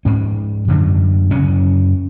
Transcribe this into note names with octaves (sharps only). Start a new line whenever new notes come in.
G#2 C#4
F#2 D3
F#2 C#3 C#4